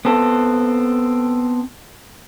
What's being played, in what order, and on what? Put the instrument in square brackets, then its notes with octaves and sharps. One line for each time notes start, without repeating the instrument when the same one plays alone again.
[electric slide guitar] B3 C4 A4